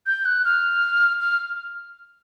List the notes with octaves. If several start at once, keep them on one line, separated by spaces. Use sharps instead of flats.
G6
F#6
F6
F6